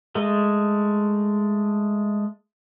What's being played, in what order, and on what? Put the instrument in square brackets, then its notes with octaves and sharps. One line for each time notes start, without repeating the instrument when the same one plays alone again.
[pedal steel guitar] G#3 A3